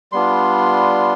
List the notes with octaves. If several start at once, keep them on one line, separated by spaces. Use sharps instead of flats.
G3 B3 D4 F4 C6